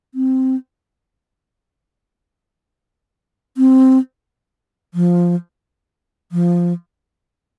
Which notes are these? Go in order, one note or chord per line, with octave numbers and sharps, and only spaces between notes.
C4
C4
F3
F3